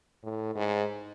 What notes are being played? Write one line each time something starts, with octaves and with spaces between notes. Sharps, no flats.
A2
G#2